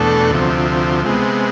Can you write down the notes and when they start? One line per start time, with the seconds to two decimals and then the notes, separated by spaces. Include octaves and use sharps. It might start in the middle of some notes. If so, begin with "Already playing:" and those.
Already playing: E2 B2 A3 D4 A4
0.31 D2 C3 F3
1.04 C3 G#3 B3